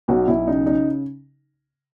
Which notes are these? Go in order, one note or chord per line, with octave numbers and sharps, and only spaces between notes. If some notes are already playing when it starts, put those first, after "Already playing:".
B1 F#4
B1 E4
C#3 D#4
C#3 D#4